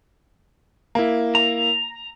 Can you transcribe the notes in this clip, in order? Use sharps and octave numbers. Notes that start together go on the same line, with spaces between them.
A#3 E4
A#5